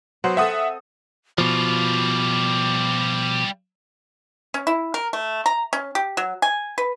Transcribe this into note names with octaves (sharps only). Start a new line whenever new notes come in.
F#3 B3 C5 F#5
C4 A4 E5 F#5 D#6
B2 F3 G3 F4 D6
C#4
E4
A#4
A3
A#5
C#4
G4
F#3
G#5
B4